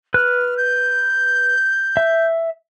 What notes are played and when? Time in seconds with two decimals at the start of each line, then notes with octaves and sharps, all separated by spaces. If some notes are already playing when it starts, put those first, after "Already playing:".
0.14 B4 F6 F#6
0.57 G6
1.97 E5